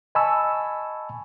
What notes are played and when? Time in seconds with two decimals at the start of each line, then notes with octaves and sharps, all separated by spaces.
0.15 D#5 G#5 A5 B5 C#6 E6